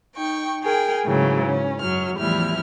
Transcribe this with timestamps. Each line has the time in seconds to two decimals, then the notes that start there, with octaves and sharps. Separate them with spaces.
0.16 D#4 G5 C#6
0.62 G#4 A#4 G5 G#5
1.05 G#2 C#3 E3 F#3 A3
1.45 C#4
1.80 F#2 F#3 F6
2.18 E2 A2 F3 G3 E4 F6